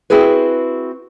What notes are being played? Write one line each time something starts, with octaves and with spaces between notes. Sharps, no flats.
C4 E4 F#4 G#4 B4